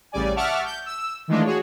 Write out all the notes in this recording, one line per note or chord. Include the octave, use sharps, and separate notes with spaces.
A1 C#3 G3 D5 G#5
E5 F#5 A5 C#6 D6 F6
G6
E6
D#3 E3 G#3 A3 D4 F4
F#4 G#4 C#5